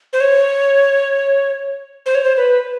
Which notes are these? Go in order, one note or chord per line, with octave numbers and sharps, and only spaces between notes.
C5
C#5
C5
C#5
C5
B4